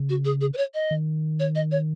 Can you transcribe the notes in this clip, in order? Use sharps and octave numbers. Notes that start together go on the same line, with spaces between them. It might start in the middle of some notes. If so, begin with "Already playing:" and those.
Already playing: C#3
F#4
G#4
G#4
B4
C#5
D#5
D#3
C#5
D#5
C#5